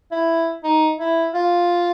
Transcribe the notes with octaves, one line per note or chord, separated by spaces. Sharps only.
E4
D#4
E4
F4